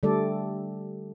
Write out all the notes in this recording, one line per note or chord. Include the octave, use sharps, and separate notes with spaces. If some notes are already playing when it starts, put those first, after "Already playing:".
D3 G3 A3 A4 D5